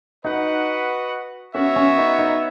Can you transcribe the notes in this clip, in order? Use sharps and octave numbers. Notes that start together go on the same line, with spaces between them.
D#4 F#4 B4 D#5 F#5
B3 C#4 F#4 C#5 E5
C#4
D#4
D#4